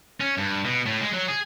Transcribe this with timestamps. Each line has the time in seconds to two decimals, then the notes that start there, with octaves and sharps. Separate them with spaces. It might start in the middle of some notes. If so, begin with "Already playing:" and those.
0.20 C#4
0.38 G2
0.65 B2
0.86 A2
1.01 G#3
1.13 F#3
1.28 G#4